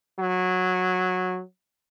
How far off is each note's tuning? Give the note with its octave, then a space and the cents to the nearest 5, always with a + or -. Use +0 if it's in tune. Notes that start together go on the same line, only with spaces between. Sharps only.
F#3 -15